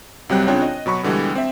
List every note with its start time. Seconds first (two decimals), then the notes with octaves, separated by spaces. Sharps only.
0.29 C2 F#3 G3 C4 F#6
0.48 C#3 C4 D4 F4 C#5 G5
0.62 D#5
0.86 B2 F#3 B5 C#6
1.03 B2 D3 E3 G3 G#3
1.35 C4 E5